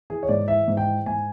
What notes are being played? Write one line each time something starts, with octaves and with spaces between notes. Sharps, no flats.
E3 G#4
C#5
G#2 D5
E3 E5
G#2
G5
E3
G#2 G#5